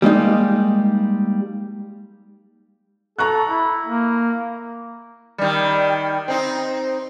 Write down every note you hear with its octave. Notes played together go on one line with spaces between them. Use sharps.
G3 G#3 A#3 D#4
A4 A#5 C#6 F#6
E4
A#3
D#3 G3
C4 D#4